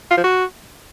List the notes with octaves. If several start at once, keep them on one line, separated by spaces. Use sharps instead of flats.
F4
F3
F#4